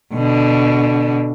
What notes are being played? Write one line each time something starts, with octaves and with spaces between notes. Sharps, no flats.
B2 D3